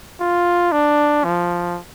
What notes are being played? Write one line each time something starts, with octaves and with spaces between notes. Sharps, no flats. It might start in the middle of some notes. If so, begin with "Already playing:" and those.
F4
D4
F3